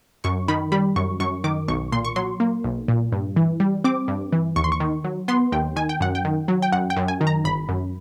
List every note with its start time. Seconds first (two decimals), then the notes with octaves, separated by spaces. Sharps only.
0.24 F#2 C#6
0.48 D#3 B5
0.72 G3 B5
0.96 F#2 C#6
1.20 F#2 C#6
1.44 D#3 D6
1.68 B1 C#6
1.92 A#2 C6
2.05 C#6
2.16 F#3 C6
2.40 A#3
2.64 B1
2.88 A#2
3.12 G2
3.36 E3
3.60 G3
3.84 C4 D6
4.08 G2
4.33 E3
4.56 D#2 C#6
4.64 C6
4.72 C#6
4.80 D#3
5.04 F#3
5.28 B3 C6
5.52 D#2 G5
5.76 D#3 G#5
5.89 G5
6.01 F#2 F#5
6.15 G5
6.25 D#3
6.48 F#3
6.62 G5
6.72 F#2 F#5
6.90 G5
6.97 F#2
7.08 G#5
7.21 D#3
7.27 A#5
7.44 G1 B5
7.69 F#2